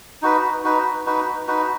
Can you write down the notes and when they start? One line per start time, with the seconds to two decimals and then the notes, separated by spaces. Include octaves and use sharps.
0.22 D#4 F#4 B4
0.64 D#4 F#4 B4
1.06 D#4 F#4 B4
1.47 D#4 F#4 B4